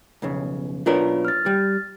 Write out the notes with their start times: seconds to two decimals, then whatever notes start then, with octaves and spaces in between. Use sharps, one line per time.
0.22 B1 F2 C#3
0.86 B1 D4 F4 A#4 B4 C#5
1.25 F6 A6
1.46 G3